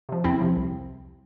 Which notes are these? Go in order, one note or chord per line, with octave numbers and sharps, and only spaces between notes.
C3 F3
E2 C4 E4
C3 F3
C2